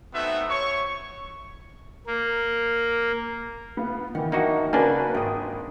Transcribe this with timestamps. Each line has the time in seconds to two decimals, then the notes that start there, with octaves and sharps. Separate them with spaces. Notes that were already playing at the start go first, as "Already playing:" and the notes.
0.14 A3 B3 C4 D#4 F#4 E5
0.49 C#5 C#6
2.06 A#3
3.77 B3 F4
4.15 D#3 E3 F#5
4.32 A#3 D4 D#4 F#4 E5 F#5
4.73 C#3 A#3 D4 F#4 B4 G#5
5.14 G#1 F4 G5 D#6